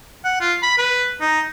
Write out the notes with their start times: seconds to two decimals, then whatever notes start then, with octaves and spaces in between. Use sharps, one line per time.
0.25 F#5
0.40 F4
0.63 B5
0.78 B4
1.21 D#4